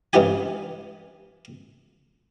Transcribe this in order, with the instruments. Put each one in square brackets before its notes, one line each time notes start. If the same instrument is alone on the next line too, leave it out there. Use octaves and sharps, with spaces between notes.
[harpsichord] C#2 G2 E3 F4 G4 G#5